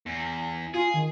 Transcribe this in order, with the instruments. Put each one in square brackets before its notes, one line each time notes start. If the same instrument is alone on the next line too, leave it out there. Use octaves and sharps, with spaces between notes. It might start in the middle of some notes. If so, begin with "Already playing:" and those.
[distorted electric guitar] E2
[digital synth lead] F4 [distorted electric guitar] G#4
[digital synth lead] D#3